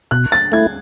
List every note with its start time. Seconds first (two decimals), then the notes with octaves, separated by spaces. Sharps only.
0.11 B2 F#6
0.32 A6
0.52 A3 E4 G#6